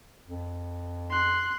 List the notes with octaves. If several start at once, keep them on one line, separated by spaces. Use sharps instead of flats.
F2
C6 F#6